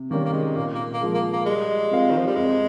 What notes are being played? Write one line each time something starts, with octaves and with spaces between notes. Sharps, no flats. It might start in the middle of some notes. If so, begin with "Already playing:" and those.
Already playing: C3
D#3 G3 A#3 C#4
A#3
G#3
A#2 A#3
A#3
A#3
F3 G#3
A#3
A#3
G3 G#3
C4 F4 A#4 F5
D#3
F3
G3
F2 G#3